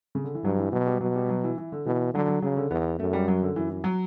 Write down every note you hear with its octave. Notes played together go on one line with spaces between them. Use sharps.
C#3
D3
E3
G2 F#3
E3
B2 F#3
G3
B2 F#3
G3
F#3
E3
E3
D3
B2 E3
D3 F#3
F#3
C#3 F#3
D3
E2 B3
F#2 A3
G3
F#3
D3
F#2 E3
E3
F#3